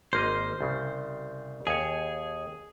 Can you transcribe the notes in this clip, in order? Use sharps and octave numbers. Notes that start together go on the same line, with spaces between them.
G#1 A#3 C5 D#5
C2 C#3
D#2 G#4 C#5